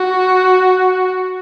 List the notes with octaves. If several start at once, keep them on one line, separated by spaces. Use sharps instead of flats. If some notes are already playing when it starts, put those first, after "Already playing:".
Already playing: F#4